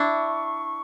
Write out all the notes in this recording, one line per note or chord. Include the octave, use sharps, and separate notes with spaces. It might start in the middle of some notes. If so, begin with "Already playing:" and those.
Already playing: D4 E4 C#6